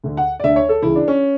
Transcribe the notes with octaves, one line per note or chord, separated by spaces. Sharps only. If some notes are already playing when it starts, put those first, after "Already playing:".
D2 D3
F#5
D5
D2 D3 E5
C#5
A4
C#2 C#3 E3 E4
D4
C#4